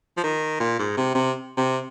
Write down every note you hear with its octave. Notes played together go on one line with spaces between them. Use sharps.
F3
D#3
A#2
G#2
C3
C3
C3